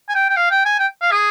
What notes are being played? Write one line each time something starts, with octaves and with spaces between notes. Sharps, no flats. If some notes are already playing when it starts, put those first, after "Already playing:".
G#5
G5
G5
F5
G5
G#5
G5
F5
G#4